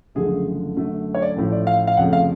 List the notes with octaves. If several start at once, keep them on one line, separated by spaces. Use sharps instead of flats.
F#1 F#2 D3 F3 A3 G#4
F#2 D3 F#3 A3
C#5
D5
A1 A2 F3
D5
F5
F5
F1 F2 C#3 F3 A3 F#5
F5